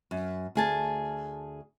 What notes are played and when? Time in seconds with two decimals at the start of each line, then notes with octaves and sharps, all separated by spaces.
0.11 F#2
0.55 D2 G#4 A5